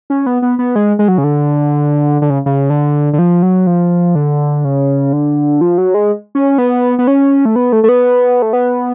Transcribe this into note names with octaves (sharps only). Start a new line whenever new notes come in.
C#4
B3
B3
B3
G#3
G#3
F#3
C#3
D3
D3
C#3
C#3
D3
D3
F3
F#3
F3
D3
C#3
D3
F3
F#3
G#3
C#4
B3
B3
C#4
A3
B3
A3
A3
B3
A3
B3